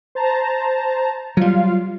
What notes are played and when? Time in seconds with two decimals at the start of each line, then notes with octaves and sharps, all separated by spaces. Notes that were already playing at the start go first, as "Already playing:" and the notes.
0.15 C5 A5 A#5
1.37 F#3 G3 F4 F5